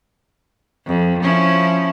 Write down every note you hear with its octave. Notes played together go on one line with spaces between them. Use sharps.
F2
F3 C#4 E4